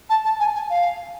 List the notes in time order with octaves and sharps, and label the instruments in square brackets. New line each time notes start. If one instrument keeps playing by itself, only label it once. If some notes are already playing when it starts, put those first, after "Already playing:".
[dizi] A5
A5
G#5
G#5
F5